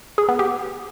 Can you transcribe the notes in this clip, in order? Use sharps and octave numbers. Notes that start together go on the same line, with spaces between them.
G#4
B3
G4